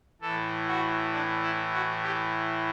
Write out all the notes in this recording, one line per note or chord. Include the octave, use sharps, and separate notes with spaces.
A2 E3 A4
F#4
D4
E4
F#4
G4